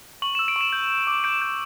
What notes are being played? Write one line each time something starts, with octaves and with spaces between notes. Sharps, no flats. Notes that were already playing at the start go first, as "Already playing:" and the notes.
C#6 F#7
E6 E7
D7
C#6 E7
G6
G6
D6
G6 D7
G6